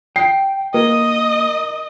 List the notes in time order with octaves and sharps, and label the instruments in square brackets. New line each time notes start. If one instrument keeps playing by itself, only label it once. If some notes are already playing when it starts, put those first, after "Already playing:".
[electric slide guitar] G5 [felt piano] C7
[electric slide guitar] A#3 [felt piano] A#4 [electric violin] D#5